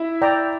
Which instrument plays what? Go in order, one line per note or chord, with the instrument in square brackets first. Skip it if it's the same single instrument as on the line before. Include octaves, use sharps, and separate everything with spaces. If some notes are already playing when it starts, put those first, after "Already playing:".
Already playing: [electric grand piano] E4 E5
[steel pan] D5 G5 A#5